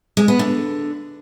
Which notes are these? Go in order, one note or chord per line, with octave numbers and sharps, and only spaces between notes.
G#3
B3
D3